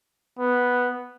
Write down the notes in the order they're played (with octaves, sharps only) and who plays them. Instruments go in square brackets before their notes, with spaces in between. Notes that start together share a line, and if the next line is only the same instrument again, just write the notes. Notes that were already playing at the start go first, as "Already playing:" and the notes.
[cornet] B3